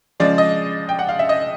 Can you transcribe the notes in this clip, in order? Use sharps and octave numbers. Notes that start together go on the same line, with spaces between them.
C#3 F3 G#3 D5
D#5
G5
F#5
F5
E5
D#5